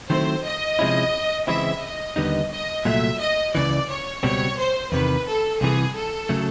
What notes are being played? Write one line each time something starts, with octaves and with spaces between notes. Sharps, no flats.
D#3 F#3 A3 C4 E4 C5
D#5
C3 F3 G#3 C#4 E4
C#3 E3 G#3 C4 E4 E5
D#5
D#2 D3 G3 B3 D#4
D#5
C2 A#2 F#3 A3 E5
D#5
C#2 C#3 E3 D5
C#5
C#2 B2 G3 C4 C#5
C5
E2 C3 D#3 B4
A4
C2 C3 E3 G#4
A4
C#3 F#3 A3